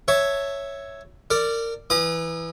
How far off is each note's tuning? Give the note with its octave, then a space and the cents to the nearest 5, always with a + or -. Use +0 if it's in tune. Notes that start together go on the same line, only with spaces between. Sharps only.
C#5 +0 E5 +0 A5 +15
A#4 -25 D5 +0
E3 +0 A#5 +45 D#6 -30